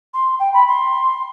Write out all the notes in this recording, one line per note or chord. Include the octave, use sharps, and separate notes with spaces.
C6
G5
B5
C6